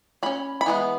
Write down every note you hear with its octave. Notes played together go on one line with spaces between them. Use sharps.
F#3 C#4 B5
B5
E3 G#3 B3